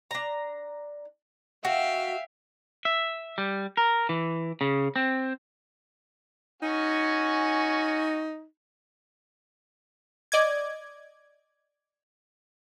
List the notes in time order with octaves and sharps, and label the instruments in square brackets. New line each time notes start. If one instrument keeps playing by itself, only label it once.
[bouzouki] D4 A#5
[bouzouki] F#4 [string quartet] E5 F5 G5
[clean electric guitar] E5
G3
A#4
E3
C#3
C4
[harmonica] C#4 F#4 G#5 [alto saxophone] D#4
[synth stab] D5 D#5 D6 G#6